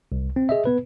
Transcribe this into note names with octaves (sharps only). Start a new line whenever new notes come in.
C2
C4
G#4 D#5 E5
B3 B4